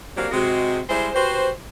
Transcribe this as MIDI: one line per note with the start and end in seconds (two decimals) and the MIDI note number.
0.16 0.27 54
0.16 0.27 58
0.16 0.27 60
0.16 0.27 62
0.16 0.27 67
0.16 0.27 77
0.32 0.79 48
0.32 0.79 56
0.32 0.79 66
0.90 1.09 55
0.90 1.09 56
0.90 1.09 64
0.90 1.09 72
1.15 1.49 66
1.15 1.49 67
1.15 1.49 71
1.15 1.49 72